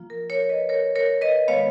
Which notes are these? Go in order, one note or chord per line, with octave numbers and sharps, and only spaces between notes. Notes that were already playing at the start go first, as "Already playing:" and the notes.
Already playing: F3 A#3 F4
A#4
A#4 C#5
B4 D#5
A#4 C#5
A#4 C#5
B4 D#5
D#3 G#3 B3 C#5 F5